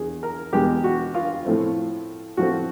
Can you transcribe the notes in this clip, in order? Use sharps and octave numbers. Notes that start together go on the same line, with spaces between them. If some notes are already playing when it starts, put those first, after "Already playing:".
Already playing: E2 G#4
A#4
E2 B2 G#3 G4
F#4
F4
A2 F3 A3 C4
A2 F3 A3 C4 F#4